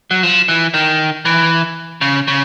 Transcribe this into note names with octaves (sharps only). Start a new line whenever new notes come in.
F#3
F3
E3
D#3
E3
C#3
C#3